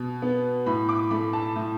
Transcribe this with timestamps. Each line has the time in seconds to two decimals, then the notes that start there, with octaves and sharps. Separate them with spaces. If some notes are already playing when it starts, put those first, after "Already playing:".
Already playing: B2
0.22 B3
0.66 A2 B5
0.89 D6
1.10 A3 B5
1.33 A5
1.56 A2